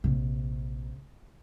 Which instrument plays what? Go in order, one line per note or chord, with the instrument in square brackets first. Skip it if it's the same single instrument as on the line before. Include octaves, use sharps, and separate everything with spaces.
[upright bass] A#1 C3